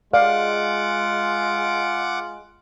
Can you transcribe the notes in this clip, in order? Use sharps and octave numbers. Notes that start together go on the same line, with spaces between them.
G#3 F4 D5 F5 F#5 D6